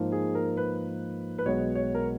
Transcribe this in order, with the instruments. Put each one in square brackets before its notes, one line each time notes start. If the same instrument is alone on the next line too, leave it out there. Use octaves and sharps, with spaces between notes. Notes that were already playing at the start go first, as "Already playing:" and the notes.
Already playing: [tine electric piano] G#2 F3 A#3 D#4
[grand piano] G#4
A#4
B4
B4
[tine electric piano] B1 B2 G#3 B3 [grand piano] C#5
[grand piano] C#5
A#4